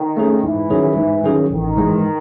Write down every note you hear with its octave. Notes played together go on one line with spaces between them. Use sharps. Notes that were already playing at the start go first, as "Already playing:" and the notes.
Already playing: D#3
A3 C#4 G#4
G#2 E3
D#3 F#3 C#4 G#4
G#2
D#3 F#3 C#4 G#4
A1 D#3
G#2 E3 G#3